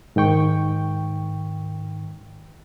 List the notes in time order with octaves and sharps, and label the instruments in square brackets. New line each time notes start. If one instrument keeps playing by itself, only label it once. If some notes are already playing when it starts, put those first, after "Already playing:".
[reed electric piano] G#2 D#3 G5 C#6